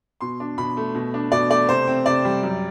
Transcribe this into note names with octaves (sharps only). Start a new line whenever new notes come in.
B2 C6
D4
B2 B5
A3
B2
D4
B2 D5
A3 D5
C3 C5
C4
C3 D5
G3
F#2